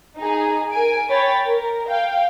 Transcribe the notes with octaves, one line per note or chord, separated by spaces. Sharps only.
D#4 G#4
A#4 G#5 D7
C#5 G5 B5 A6
A#4
F5 G5